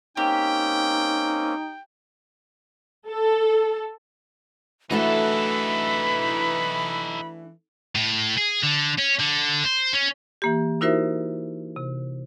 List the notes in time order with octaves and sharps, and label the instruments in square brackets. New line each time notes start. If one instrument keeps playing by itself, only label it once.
[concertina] A#3 C4 C#4 [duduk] D#4 [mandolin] G4 [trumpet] G5
[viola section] A4
[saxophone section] E3 [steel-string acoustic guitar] A3 D4 F#4 [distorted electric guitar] D#4 A4 [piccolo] B5
[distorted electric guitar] A2
G#4
D3
C#4
D3
C5
C#4
[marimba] E3 A#3 G4
D#4 E4 F#4 A#4 C5 E5
C3